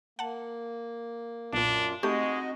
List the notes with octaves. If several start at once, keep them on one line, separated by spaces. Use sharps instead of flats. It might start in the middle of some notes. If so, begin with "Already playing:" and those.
A#3 F#5 A5
B1 F#2 A#2 D4 F4
G#3 A3 C4 D#4 F#4 G4 D#5 C#6